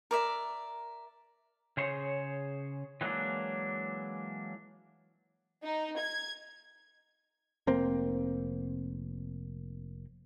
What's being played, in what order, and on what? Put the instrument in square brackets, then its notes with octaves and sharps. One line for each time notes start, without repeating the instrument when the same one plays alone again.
[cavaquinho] A#4 D5 E5
[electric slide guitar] C#3 G#4 C5 C#5
E3 F#3 G#3 A#3 D4
[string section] D#4
G#6
[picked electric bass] F1 A#3 C4